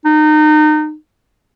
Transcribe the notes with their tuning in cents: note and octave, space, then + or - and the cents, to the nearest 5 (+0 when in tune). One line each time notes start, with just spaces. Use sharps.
D#4 -30